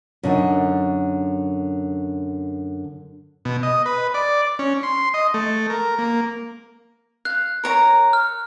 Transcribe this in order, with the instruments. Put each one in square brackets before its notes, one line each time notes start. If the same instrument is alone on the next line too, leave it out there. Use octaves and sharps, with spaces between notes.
[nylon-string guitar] F#2 D3 D#4
[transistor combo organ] B2
D#5
B4
D5
C#4
C6
D#5
A3
A#4
A#3
[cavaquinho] F5 [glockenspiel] F#6
[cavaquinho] A#4 C#5 A#5
[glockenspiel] F6